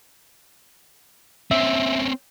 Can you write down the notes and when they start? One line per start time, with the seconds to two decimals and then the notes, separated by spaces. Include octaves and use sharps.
1.51 C4 C#4 E5